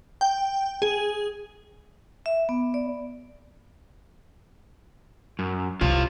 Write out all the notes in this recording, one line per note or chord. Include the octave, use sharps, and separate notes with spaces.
G5
G#4
E5
B3
D5
F#2
C2 F4 C#5 F5